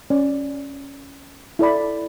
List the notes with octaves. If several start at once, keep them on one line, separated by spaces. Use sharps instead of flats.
C#4 D5
E4 A4 D5 B5